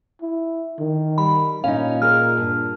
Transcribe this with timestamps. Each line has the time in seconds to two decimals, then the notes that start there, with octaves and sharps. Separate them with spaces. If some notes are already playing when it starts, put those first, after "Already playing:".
0.22 E4
0.79 D#3
1.18 G3 B5
1.64 A#2 C#4 D#4 F5
2.02 G#4 A#4 F6
2.37 G2